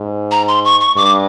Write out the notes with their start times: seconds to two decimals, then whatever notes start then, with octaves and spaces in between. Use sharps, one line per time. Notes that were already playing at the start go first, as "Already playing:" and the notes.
Already playing: G#2
0.31 A#5
0.48 C6
0.65 C#6
0.81 C#6
0.97 G2 D6